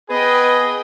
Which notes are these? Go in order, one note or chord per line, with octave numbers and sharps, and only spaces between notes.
B3 G#4 B4 D#5 G5